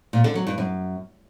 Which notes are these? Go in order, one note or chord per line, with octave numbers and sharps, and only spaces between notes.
A#2
D3
F#3
G2
F#2